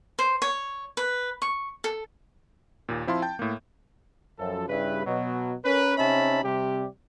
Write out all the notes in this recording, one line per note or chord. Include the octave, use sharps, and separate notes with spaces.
C5
C#5
B4
C#6
A4
D#2 A#2
F3 C4 E4 F5 A5 C6
G5 A5 G6
A2 A#3
F#2 F3 A4
G2 C#3 G3 E4 B4
B2 F#3
C#4 A#4 B4
C3 C#4 D#4 E5 A5 B5
C3 G3 G4